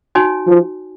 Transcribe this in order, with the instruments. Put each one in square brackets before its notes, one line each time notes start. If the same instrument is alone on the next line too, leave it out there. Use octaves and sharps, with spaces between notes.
[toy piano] D#4 F#4 C#5 G#5
[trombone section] F3